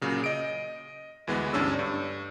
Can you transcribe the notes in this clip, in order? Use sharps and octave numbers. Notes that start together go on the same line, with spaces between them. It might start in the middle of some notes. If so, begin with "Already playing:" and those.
A#2 C#3 F#3
D#5 D7
D2 E3 G#3 B3
D2 G2 C#4 D4 E6
G2